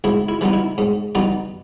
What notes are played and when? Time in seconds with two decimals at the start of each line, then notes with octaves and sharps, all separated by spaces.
0.04 G#2 E4
0.29 E4
0.41 E3 G3 B3 D#4
0.53 E4
0.78 G#2
1.15 E3 G3 B3 D#4